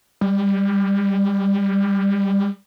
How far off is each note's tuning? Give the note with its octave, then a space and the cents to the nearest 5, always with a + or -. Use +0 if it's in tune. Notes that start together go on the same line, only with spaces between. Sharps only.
G3 +15